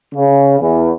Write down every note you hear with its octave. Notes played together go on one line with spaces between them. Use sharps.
C#3
E2